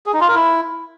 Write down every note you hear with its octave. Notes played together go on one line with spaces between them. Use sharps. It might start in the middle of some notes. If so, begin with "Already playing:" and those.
G#4
D#4
F4
A#4
E4